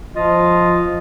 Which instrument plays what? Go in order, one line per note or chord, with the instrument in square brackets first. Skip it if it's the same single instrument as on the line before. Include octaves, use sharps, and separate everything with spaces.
[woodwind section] F3 F4 D#5